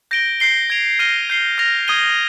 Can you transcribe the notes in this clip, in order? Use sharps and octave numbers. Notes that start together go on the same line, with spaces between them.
G6 A#6 D7 G7
G6 C7 G7
G#6 D7 F7
F6 A#6 D#7 G7
G6 C7 G7
F6 A#6 F7
D#6 G#6 D#7 G7